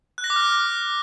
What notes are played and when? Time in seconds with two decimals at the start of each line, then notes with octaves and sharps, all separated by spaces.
0.18 F#6
0.24 A#6
0.30 D6
0.36 F6